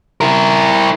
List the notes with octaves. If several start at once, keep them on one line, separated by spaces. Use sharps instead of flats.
E4 A#4